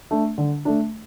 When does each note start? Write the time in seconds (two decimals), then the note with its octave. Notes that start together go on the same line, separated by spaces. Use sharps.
0.11 A3 D4
0.38 D3
0.65 A3 D4